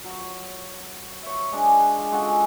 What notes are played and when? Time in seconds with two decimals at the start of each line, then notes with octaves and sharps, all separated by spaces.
0.04 F#3
1.23 C#5 E5
1.52 G#3 D4 G#4
1.98 F4
2.12 G#3 C#4 F#4 A4